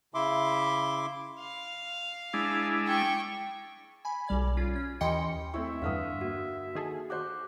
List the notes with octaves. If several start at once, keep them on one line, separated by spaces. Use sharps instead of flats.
C#3 E4 E5 C6 D6
F5
G#3 D4 E4
G5 C#6
G#5 B5
B1 G3 D5 G#6
C#4 F4
C#4
D#2 E3 D#5 G5 C6 C#7
A3 C4 E4 E5 C#6
E2 G2 D3 F5 F#5 D#6 F6
A#3 F#4
D#3 G#4 A4
F#4 C5 D6 F#6 G6